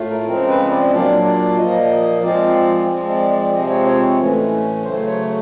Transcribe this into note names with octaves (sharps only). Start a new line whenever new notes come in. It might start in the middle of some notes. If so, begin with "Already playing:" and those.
Already playing: A2 A3 F4
A#4
C#3 F3 G#3 C4 A#4
B4
D5
D#5
A#2 F#3 A#3 D4 F4 D5
D5
A#2 F3 A#3 D#5
F3 G#3 C4 F4 D5
F3 G#3 C4
D5
D5
C3 F3 G#3 C4 D#5
C#5
C#5
A2 E3 A3 C#4
C#3 F#3 A3 C5
C#5